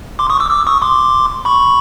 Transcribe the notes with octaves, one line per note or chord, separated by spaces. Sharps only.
C6 D6
C#6 D#6
D6 E6
D6 E6
C#6 D#6
C6 D6
B5 C#6